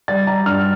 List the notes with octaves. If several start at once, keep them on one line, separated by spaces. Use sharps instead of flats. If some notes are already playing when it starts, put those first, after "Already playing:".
G3 A6
G3 A#5
G2 F6